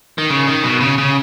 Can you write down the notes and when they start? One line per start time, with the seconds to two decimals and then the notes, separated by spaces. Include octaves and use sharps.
0.18 D#3
0.30 C#3
0.47 D#3
0.64 B2
0.81 C#3
0.98 C#3